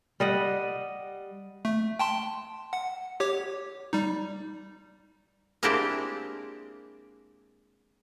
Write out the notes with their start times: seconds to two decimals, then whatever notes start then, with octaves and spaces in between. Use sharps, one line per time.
0.20 G3 D#5 F#5
1.65 A3
1.99 G5 A5 C6
2.73 F#5
3.20 G4 C#5 D6
3.93 G3 D#4
5.63 G#3 A#3 C4 D4 E4 G4